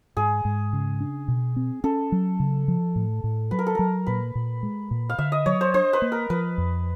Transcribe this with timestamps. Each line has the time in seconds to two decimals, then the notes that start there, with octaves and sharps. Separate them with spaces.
0.17 G#2 G#4
0.45 G#2
0.73 C#3
1.00 D4
1.28 B2
1.56 C4
1.84 C#4 A4
2.12 F#3
2.40 C#3
2.68 F3
2.96 A2
3.24 A2
3.51 F#3 B4
3.59 A#4
3.67 A4
3.75 F#3 A#4
4.07 A#2 B4
4.35 A#2
4.63 G#3
4.91 A#2
5.10 F5
5.18 D3 E5
5.32 D#5
5.46 F#3 C#5
5.61 C5
5.74 D4 C5
5.93 B4
6.02 A#3
6.12 A#4
6.30 F3 B4
6.58 F2